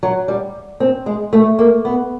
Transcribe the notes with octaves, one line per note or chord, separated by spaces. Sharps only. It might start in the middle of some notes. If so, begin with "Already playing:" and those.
F#3
G3
C4
G#3
A3
A#3
B3